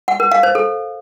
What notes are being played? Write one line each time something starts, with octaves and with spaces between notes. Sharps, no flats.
F#5
A#4
F5
C5
A4